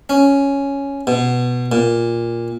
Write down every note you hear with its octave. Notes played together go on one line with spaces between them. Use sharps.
C#4
B2
A#2